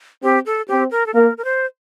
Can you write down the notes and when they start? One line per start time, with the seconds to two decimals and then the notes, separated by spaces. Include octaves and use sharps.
0.23 C4 G4
0.46 A4
0.68 C4 G4
0.91 A#4
1.06 A4
1.13 A#3 A#4
1.38 A#4
1.45 C5